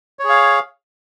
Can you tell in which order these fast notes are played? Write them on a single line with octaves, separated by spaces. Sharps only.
C#5 G#4 F5